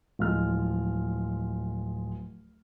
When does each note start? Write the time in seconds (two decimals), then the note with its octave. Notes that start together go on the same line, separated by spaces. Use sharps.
0.19 D1 F3 G#3 F6